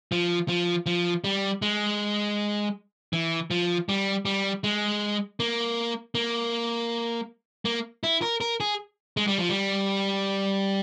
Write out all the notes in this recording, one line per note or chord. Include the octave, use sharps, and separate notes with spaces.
F3
F3
F3
G3
G#3
E3
F3
G3
G3
G#3
A#3
A#3
A#3
E4
A#4
A#4
G#4
G#3
G3
F3
G3